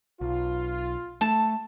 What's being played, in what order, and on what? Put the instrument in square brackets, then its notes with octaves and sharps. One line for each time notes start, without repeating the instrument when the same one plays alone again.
[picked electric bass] B1 [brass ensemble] F4
[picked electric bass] A3 [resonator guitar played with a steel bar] A5